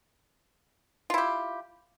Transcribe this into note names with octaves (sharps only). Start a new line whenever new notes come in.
E4 F4 G4